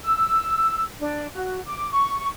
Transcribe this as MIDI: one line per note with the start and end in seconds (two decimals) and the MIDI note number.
0.03 0.82 88
0.98 1.26 62
1.35 1.59 66
1.65 1.88 86
1.91 2.27 85